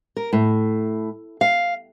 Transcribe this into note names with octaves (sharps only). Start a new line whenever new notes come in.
A#4
A2
F5